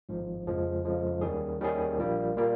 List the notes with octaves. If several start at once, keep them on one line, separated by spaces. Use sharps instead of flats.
G#1 G#2 F3
F2 C#3 F3 G#3
F2 C#3 F3 G#3
D#2 D#3 G3 C#4 G#4
D#2 D#3 G3 C#4 G#4
A#1 A#2 G3 A#3
A#2 G3 A#3